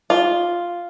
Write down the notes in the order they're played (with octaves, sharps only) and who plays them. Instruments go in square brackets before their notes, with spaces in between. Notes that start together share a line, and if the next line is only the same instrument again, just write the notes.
[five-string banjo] F4